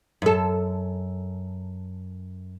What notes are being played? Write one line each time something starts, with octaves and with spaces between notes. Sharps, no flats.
F#2 A4